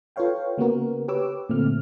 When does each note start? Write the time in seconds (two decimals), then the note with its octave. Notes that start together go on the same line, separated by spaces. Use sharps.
0.16 F4 A4 B4 C#5 F5 G5
0.57 C#3 A#3 B3 F#4 A#4
1.08 G4 B4 C#5 D6 E6
1.49 A#2 D3 A3 C4 F6